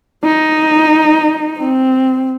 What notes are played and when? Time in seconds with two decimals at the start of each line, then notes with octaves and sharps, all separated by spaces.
0.23 D#4
1.58 C4